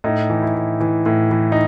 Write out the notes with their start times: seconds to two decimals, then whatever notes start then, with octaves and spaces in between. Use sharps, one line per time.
0.04 A2 D#4
0.30 E3
0.42 E4
0.55 A2
0.80 E3
1.06 A2
1.31 E3
1.52 D#4